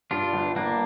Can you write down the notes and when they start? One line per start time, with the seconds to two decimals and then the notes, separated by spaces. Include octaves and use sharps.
0.11 G2 D4 F4
0.33 G1
0.56 G1 A#3 D4